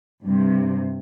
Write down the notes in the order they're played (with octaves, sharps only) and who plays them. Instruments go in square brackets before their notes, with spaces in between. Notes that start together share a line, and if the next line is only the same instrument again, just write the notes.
[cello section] G2 C3